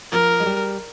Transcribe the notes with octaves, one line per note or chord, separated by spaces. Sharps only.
F3 A#4
G#3
G3